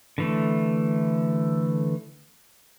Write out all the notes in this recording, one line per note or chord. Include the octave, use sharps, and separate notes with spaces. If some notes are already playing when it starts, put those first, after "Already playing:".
D3 E3 A3